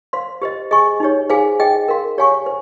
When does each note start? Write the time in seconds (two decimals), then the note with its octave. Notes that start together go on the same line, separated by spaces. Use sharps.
0.13 C5 F5 C6
0.42 G4 C5 D#5
0.71 G#4 D#5 G#5 C#6
1.00 D#4 G4 C#5
1.30 G#4 C5 F5 G#5
1.60 G#4 D#5 G5
1.88 A#4 F5 C6
2.18 G4 C#5 F5 G#5 C#6
2.46 C5